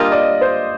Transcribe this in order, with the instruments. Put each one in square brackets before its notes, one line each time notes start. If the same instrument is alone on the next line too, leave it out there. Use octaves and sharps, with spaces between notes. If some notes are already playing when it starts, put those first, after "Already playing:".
Already playing: [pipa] G3 A#3 D4 F4 [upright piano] D#5
[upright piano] D5
C5